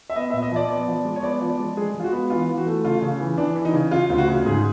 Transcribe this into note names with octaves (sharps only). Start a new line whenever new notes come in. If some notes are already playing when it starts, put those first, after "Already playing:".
E5
B3 D#5
E5
A#2
D#5
F3 D5
B3 D5
F3
G#3
C#5
B3 D5
F3
D5
G#3
G#3 G#4
G#3
F4
F#4
B3
E3 F4
E3
F#4
A3
C#3 F4
C#3
E3
E3 D4
E3
D#4
C#3
C#3 F4
D2 F4
F#4
C#3
G#2 G#4